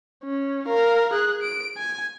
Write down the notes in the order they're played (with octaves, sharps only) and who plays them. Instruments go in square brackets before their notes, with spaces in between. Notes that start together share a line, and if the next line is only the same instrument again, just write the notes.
[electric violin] C#4
A#4 F5
G#4 F#6
D7
G#5